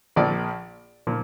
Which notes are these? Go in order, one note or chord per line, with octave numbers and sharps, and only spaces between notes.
A#1 A#2 F3 D5
A#2 F3